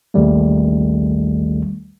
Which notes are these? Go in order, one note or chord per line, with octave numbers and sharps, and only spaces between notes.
A1 D#2 D#3 G3 A3